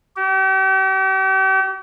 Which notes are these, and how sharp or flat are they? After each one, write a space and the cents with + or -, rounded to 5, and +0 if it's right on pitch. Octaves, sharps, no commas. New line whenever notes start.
G4 -40